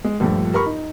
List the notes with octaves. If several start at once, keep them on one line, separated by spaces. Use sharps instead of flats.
G#3
A#1 G2 F3 A3
G4 A#4 B5 C#6
D#4